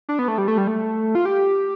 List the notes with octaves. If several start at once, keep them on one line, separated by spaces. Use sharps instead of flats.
D4
B3
A3
G3
A3
G3
A3
F4
G4